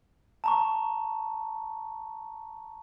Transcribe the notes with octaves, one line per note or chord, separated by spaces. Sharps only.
A5 A#5 C#6